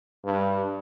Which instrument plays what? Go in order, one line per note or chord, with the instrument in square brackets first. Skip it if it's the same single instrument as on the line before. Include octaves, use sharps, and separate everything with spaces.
[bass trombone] G2